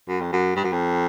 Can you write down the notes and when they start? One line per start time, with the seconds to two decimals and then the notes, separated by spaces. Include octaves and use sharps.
0.08 F#2
0.21 F2
0.33 F#2
0.56 G2
0.64 F#2
0.72 F2